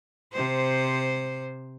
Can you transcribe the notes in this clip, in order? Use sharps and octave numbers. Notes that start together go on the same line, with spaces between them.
C3 C5